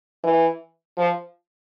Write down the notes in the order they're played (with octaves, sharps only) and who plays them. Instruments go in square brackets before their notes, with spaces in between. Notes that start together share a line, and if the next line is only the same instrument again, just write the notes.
[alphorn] E3
F3